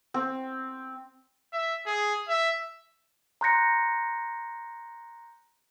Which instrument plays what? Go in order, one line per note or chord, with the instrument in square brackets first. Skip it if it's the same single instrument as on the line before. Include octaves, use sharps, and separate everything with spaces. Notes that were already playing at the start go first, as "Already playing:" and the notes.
[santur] C4
[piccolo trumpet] E5
G#4
E5
[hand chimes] A#5 C6 F#6 G6 A#6 C#7